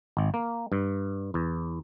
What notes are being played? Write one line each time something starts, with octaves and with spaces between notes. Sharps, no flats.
G#1
A#3
G2
E2